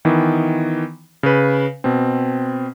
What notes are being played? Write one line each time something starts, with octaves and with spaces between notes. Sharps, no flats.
D#3 E3 B3
C#3 B4
B2 C4